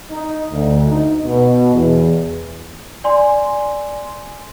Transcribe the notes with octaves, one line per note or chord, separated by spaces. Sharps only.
D#4
D2
D#4
B2
E2
D5 G#5 C6